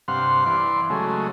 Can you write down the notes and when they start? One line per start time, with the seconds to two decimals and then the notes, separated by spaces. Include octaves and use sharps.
0.08 G2 C3 F5 F#5 C6
0.46 E3 D5 C6
0.90 C#3 F#3 G#3 A3